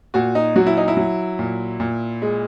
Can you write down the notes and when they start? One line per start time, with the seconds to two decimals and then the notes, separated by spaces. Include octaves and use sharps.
0.14 A#2 F#4
0.35 D#4
0.56 F#3 F#4
0.67 E4
0.77 D#4
0.88 E4
0.97 F#3
1.39 A#2
1.80 A#2
2.22 G#3